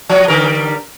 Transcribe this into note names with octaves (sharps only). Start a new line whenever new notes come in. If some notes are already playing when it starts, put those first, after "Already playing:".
F3 F#3 F#4
D3 G3 A#4